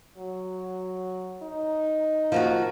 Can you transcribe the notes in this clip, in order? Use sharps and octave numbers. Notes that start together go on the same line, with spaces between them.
F#3
D#4
F3 A#3 F#4